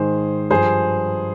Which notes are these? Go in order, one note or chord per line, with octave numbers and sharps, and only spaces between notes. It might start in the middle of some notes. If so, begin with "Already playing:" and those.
Already playing: G#2 D#3 G#4 C5
G2 F3 G#4 C5